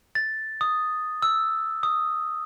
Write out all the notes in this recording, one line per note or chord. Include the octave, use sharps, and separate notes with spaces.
A6
D#6
E6
D#6